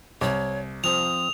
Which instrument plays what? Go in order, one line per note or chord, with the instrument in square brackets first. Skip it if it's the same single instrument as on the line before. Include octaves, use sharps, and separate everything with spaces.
[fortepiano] C2 [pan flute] C#5
[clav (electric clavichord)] F3 C4 C5 [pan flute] D#6 [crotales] F7